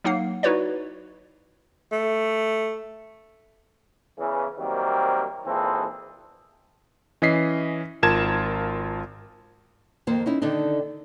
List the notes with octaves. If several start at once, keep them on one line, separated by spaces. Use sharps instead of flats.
F#3 A#3 D#4 F#5 C7
D#4 E4 F#4 B4 C#5 D5
A3
E2 C#3 E3
C3 D#3 F#3 G3 A#3 C4
G#1 A#2 E3 C4 G#4 A4
E3 C#4 D#5 B6 C7
G#1 F4 A#4 A5 G#6 E7
F2 D#3 A#3 C5
C#4 D#4 E4
D3 D#3 D4 D#4